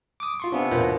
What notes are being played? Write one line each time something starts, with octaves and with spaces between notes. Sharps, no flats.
D6 D#6
F4 C6 C#6
C3 B3 D4 G#5
E2 B2 A#3 F4 B4